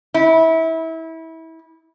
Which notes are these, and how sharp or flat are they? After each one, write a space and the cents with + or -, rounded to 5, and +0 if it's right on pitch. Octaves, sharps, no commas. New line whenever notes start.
E4 -25